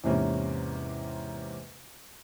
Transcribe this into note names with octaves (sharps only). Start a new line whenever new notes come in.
E2 G#2 C3 A#3 C#4